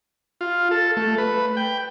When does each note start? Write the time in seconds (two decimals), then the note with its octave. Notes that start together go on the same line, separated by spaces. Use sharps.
0.41 F4
0.71 A4
0.97 A3
1.18 B4
1.57 G5